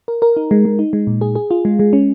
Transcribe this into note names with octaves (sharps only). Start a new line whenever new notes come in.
A#4
A#4
D#4
G#3
G#3
D#4
G#3
A#2
G#4
G#4
F4
G#3
G#3
C#4